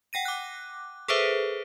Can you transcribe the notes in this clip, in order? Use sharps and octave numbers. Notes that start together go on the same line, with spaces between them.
F#5 G5 A#6 D#7
D6 F#6
G#4 A4 B4 C5 E5